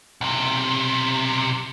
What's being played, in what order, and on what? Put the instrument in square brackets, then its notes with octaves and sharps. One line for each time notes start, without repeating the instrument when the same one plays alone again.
[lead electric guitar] B1 C3